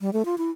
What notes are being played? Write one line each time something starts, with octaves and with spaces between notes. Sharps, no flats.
G3
A3
F4
E4